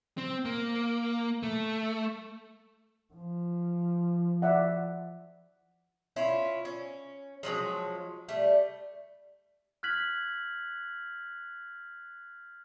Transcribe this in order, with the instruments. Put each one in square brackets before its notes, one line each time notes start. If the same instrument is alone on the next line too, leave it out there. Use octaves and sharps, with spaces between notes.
[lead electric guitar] C4
A#3
A3
[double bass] F3
[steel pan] D5 E5 F#5
[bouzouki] C#4 E4 F4
C#4
F3 F#3 G#3 C#4
G3 A3
[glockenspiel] F6 F#6 G#6 B6 F#7